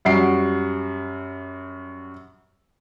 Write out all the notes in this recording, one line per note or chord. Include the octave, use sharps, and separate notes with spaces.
F#2 G3 F#4 C7 D7